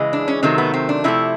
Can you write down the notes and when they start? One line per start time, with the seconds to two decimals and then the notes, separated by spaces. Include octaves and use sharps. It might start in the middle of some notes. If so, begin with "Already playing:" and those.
Already playing: C#3 E3 G#3
0.13 D4
0.28 C#4
0.43 C3 D#3 F#3 A3 C4
0.58 B3
0.74 C4
0.89 D4
1.04 C3 F3 A3 E4